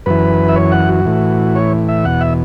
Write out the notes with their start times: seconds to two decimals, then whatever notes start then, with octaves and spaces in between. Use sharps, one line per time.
0.06 F#2 E3 B4
0.49 E5
0.56 C#5
0.72 F#5
0.89 F#4
1.05 A2 E3
1.55 C#5
1.89 E5
2.04 E2 B2 F#5
2.21 E5